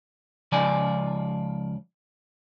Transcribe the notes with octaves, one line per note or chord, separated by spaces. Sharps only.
C#2 C#3 F3 F4 D5 G#5